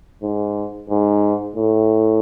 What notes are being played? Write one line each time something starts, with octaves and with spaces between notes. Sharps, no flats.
G#2
G#2
A2